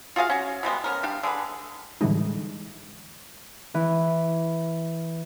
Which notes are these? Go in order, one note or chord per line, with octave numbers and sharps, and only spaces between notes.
F4 F#4 G#4 F5
C#4 F#4
B2 G3 G#3 B3
B3 C#4 A#4
G3 D4 F5
D3 G#4 A4 B4
A2 D3 E3 G3 G#3 D#4
E3